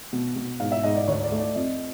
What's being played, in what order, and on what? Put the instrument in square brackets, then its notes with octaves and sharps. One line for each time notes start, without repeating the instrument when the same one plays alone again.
[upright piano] B2
B2
G#2 F5
E5
G#2 D#5
D5
D2 C#5
D5
A3
D5
F2 D#5